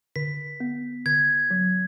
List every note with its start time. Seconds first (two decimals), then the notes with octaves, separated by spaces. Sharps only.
0.16 D3 B6
0.60 B3
1.06 D3 G#6
1.51 F#3